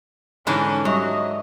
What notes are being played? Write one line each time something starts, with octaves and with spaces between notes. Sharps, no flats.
G#2 D3 E3 C#4 A#4 A5
F#3 G3 C#5 D#5 E5